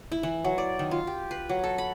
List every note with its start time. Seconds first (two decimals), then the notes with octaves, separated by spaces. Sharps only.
0.12 E4
0.23 E3
0.44 F#3
0.58 D5
0.79 D#3
0.91 F4
1.07 G4
1.31 B4
1.49 F#3
1.64 A4
1.78 B5